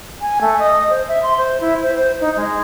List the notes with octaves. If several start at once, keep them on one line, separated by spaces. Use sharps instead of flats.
G#5
A3
D#5
C5
E5
C6
C5
E4
C5
C5
D#4
G#3